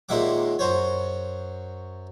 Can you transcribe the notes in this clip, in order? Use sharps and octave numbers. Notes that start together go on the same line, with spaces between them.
D#2 A#2 G#3 E5 F#5 D6
F#2 F#4 C5 C#5